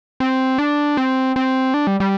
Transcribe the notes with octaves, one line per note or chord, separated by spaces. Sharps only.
C4
D4
C4
C4
D4
G3
G3